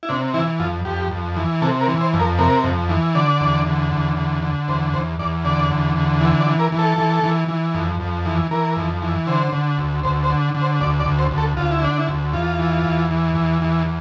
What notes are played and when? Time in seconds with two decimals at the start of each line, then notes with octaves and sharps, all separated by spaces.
0.03 E4
0.09 C3 D4
0.34 E3 E4
0.60 F2 F4
0.85 F2 G4
1.11 F2
1.36 E3
1.62 C3 A4
1.81 A#4
1.87 E3
2.01 C5
2.14 F2
2.20 A#4
2.39 C3 A#4
2.64 F2
2.89 E3
3.15 D3 D5
3.40 E2
3.66 D3
3.92 E2
4.17 D3
4.42 D3
4.68 E2 C5
4.93 E2 C5
5.19 E2 D5
5.45 D3 D5
5.71 E2
5.96 D3
6.21 E3
6.40 D5
6.46 E3
6.59 A#4
6.72 E3
6.79 A4
6.98 E3
7.23 E3
7.48 E3
7.74 F2
8.00 F2
8.26 E3
8.51 E3 A#4
8.77 F2
9.02 E3
9.27 D3 C5
9.52 D3
9.78 D2
10.03 D2 C5
10.23 C5
10.30 D3
10.54 D3
10.62 C5
10.81 D2 D5
11.00 D5
11.06 D2
11.19 C5
11.31 D2
11.38 A4
11.57 D2 F4
11.71 E4
11.82 D3 D4
11.98 E4
12.08 D2
12.33 E2 F4
12.59 E3
12.84 E2
13.11 E3
13.35 E2
13.62 E3